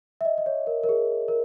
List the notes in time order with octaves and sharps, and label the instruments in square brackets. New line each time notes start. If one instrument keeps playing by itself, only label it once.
[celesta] E5
D#5
D#5
C#5
A#4
A#4
G#4
A#4